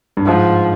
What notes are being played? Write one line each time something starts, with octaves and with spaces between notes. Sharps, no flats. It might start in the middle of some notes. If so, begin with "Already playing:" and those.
G2
G#2 F3